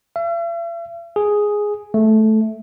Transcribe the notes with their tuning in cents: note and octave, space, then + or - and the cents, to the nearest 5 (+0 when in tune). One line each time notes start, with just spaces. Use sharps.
E5 +45
G#4 +0
A3 -10